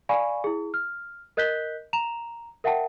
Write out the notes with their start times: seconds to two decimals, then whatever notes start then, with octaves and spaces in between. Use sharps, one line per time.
0.09 D5 F5 G#5 B5 C#6
0.44 E4 G#4
0.74 F6
1.37 A#4 D#5 F#6 G6 B6 G7
1.93 A#5 E7 F7
2.64 A#4 E5 F#5 G5 A5